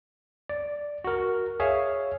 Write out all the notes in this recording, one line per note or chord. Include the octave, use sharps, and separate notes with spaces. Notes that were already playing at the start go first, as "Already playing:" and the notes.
D5
F#4 A#4
G#4 C#5 E5 F5